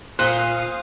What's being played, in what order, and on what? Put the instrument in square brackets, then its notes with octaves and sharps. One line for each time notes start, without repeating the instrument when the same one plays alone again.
[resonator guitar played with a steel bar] A#2 [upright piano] C5 G7 [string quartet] F5 D#6 [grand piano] F#6